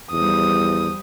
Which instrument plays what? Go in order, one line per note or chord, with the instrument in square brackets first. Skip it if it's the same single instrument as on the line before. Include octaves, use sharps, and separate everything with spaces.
[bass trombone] E2 [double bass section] F3 G3 [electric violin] D#6